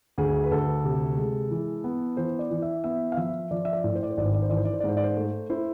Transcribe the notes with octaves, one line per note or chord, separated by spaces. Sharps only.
D2 G#4
B4
D2 A4
C3
G#3
E3
B3
E3 C5
D5
E3
E5
B3 E5
F5
F3 E5
F3 D5
E5
D5
A2
C5
D5
C5
G#1 D5
C5
D5
C5
E3 D5
C5
D5
C5
D5
G#2 C5
D5
C5
A3
E4 C5